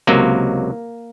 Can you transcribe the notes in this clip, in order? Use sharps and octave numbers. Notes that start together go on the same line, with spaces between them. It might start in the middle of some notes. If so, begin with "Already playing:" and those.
C#2 C3 F#3 A#3